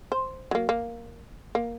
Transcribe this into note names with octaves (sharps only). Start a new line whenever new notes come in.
C5
F#3 A#3
A#3
A#3